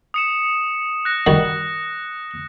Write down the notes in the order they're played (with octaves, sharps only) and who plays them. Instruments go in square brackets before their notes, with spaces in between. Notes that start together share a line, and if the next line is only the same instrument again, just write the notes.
[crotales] D#6 C#7 E7
F#6 A#6
[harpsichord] D#3 G3 F#4